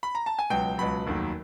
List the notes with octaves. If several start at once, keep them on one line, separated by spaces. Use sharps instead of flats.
B5
A#5
A5
G#5
C#2 B2 F#3 G5
C#2 B2 F#3 B5
F1 D#2 D#3 F#3